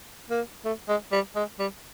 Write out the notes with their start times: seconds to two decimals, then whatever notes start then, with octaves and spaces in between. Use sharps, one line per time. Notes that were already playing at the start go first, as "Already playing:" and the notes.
0.30 A#3
0.65 A3
0.88 G#3
1.12 G3
1.36 G#3
1.59 G3